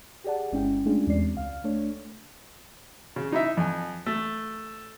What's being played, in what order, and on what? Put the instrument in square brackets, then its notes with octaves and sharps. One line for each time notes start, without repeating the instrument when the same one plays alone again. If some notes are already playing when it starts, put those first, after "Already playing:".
[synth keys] G4 G#4 D5 F#5 A5
G1 G#3 C#4 E4 G5
G#3 A3 C#4 D4 F4 G#4
E2 G3 G#3 C4 D5 C7
C#2 F5 F6
A3 D4 C#5
[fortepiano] C#3
D#4 E4 E5
F2 G#5
A3